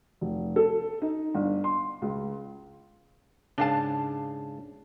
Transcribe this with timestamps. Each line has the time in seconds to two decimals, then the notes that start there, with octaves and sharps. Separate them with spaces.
0.21 F1
0.56 A4
1.02 D#4
1.34 G1
1.64 C6
2.02 C#2
3.58 G#2 C#3 D4 F5 A5